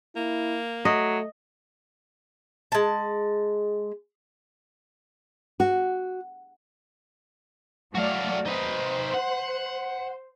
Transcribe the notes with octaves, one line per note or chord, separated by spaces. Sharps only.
A#3 E4
F#3 A3 D#5
G#3 A5
F#4
F#3 A3 F#4 D5 F5
D#4 B4 C5
F#5